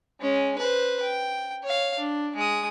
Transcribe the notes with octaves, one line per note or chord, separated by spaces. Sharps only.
G#3 C#4
B4 C5
G5
C#5 F5
D4
G#3 D#6